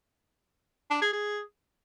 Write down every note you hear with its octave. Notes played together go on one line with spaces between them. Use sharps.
D4
G#4
G#4